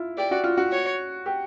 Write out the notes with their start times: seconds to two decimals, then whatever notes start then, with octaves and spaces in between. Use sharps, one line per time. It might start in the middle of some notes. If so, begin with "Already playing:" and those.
Already playing: E4 F4
0.18 G4 D5
0.31 F#4
0.44 F4
0.57 F#4
0.72 C#5
1.26 G4